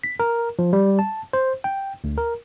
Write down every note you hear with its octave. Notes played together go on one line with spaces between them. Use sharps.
B6
A#4
F3
G3
A5
C5
G5
D2
A#4